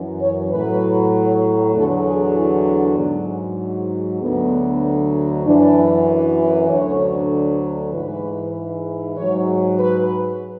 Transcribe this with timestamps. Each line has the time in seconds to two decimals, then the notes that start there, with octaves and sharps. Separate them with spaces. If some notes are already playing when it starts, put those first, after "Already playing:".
Already playing: F#2 E3
0.20 C#5
0.50 A2 F#3 B4
1.74 E2 D3 F#3 A4
2.05 G#4
2.36 E4
2.67 D4
2.97 G#2 F#3
4.21 D2 D3 F#3 B3
5.45 F#2 E3 D4
6.68 D2 D3 F#3 C#5
7.92 G#2 E3 B4
9.16 G#2 F#3 C#5
9.79 B4